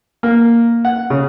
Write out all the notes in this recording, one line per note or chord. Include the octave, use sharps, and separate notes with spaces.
A#3
F#5
C#3